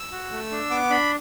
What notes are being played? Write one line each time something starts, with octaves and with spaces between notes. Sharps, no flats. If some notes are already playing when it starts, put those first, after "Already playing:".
Already playing: E6
F#4
A3
D4
B3 D6
D4 B5